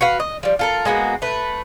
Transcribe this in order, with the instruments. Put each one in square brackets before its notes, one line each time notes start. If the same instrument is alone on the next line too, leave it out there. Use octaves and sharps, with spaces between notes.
[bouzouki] F#4 B4 F5
D#5
F3 G3
F4 A4 A#4
G#3 A#3 B3 F#4
A3 B4